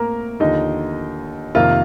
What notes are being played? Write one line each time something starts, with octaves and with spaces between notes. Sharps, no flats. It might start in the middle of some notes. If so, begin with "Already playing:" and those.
Already playing: A2 A#3 C4 A#4
D#2 D3 F3 D#4 D#5
F2 C3 D#3 A#3 F4 F5